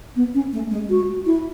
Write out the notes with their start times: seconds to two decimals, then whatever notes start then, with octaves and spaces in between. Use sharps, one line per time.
0.16 B3
0.34 C#4
0.53 A3
0.71 G#3
0.90 F#4
1.26 E4